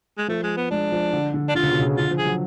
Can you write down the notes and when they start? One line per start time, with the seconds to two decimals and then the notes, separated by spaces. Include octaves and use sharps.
0.18 G#3
0.28 F3 A3
0.43 G#3
0.57 B3
0.71 G#3 D4
0.92 F3
1.13 D3
1.34 D3
1.49 D4
1.55 D3 F4
1.63 C#3
1.71 B2
1.80 C#3
1.97 D3 F4
2.11 F3
2.18 G#4
2.25 F#3